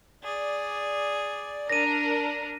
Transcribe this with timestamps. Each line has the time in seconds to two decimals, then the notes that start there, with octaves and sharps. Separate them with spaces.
0.23 G#4 D5
1.70 D4 A#4 A#6 D#7